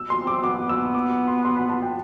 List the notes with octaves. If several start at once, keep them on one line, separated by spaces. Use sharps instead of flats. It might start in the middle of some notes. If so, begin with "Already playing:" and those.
Already playing: E6
C6
C4
D6
B3 D6
B3
E6
B3
D6
D6
C6
C6
B5
A5
G5